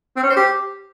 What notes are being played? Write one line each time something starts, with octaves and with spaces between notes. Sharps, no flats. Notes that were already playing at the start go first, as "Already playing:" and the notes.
C4
C#4
C5
G4